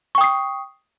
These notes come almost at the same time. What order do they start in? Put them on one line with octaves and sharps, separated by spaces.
C#6 G5 D#6 C7